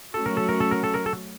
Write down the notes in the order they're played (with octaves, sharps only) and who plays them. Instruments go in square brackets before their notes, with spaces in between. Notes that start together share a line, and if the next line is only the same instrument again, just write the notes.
[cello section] F#3 A3 C#4 F#4 [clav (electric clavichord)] A4
[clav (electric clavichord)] A#4
A4
A#4
A4
A#4
A4
A#4
A4